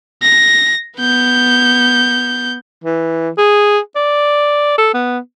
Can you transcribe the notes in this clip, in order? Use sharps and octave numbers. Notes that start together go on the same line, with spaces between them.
A#6
B3 G6
E3
G#4
D5
A4
B3